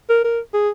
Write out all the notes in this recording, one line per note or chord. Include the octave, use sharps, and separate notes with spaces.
A#4
A#4
G#4